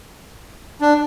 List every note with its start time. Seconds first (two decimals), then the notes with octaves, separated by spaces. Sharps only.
0.81 D4